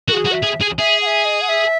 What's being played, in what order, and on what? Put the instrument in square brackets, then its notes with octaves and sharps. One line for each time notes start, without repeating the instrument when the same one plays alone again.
[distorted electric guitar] F#4 [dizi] A#4
[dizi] G#4
[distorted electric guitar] F#4
[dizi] E5
[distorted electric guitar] G#4
G#4
[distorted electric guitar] G#4 [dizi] E5
[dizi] F#5
E5
D#5
F#5
E5